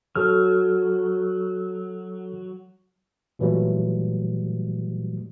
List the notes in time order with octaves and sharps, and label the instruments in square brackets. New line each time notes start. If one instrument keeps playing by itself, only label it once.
[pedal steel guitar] F#3 [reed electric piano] A4 F6
[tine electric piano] A#2 E3 F#3 G3 A3